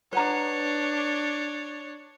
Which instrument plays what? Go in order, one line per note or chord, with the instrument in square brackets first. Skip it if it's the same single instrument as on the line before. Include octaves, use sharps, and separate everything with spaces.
[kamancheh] D4 C#5 [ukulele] B4 F#5 A#5